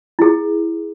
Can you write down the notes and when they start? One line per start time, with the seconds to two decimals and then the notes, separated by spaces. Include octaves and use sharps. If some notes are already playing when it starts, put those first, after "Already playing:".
0.19 E4 G#4